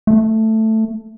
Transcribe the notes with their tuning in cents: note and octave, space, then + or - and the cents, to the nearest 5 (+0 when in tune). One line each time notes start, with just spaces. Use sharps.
A3 +5